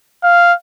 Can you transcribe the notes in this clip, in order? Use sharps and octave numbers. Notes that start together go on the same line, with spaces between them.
F5